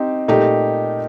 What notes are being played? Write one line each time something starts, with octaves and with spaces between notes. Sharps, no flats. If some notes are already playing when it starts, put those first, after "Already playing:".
Already playing: C4 D#4 G4
A#2 A3 D#4 G4